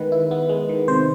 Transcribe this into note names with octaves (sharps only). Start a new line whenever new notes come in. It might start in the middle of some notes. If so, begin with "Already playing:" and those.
Already playing: D#3 G#3 B3 B4
E4
B3
G#3
D#3
C3 C5